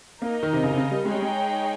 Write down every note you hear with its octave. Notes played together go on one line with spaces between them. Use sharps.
A#3 D#4 A#4 D#5
D#3
C3
C#3
C3
C#3
G3
G#3 D#4 G#4 C#5 G5
G3
G#3